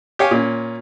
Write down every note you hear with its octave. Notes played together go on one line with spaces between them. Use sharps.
G4 C#5 F5 G#5
A#2 C#4